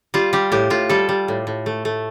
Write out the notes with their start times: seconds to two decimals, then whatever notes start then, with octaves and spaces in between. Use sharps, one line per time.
0.14 G3 F4
0.33 G3 G4
0.52 A2 G4
0.70 A2 F4
0.89 G3 A4
1.09 G3
1.28 A2
1.47 A2
1.66 A3
1.85 A3